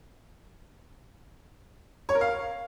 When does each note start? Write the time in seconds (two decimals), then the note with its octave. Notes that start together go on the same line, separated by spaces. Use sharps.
2.09 C#5
2.15 A#4
2.21 F5